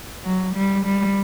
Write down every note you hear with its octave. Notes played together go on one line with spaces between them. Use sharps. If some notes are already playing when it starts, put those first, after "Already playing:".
F#3
G3
G3